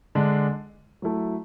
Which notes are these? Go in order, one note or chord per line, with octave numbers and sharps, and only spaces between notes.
D3 G#3 D4
F#3 A3 E4 A4